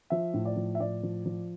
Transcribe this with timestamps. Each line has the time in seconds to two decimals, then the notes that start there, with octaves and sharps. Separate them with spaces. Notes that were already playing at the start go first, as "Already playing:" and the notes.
0.10 F3 E5
0.34 A2
0.45 D5
0.56 F3
0.75 E5
0.80 A2 D5
1.03 F3
1.26 F3